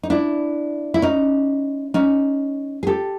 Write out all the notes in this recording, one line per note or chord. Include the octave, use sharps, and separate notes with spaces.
D#4
D4 E4
E4
C#4 D#4
C#4 D#4
G#4
G4 A4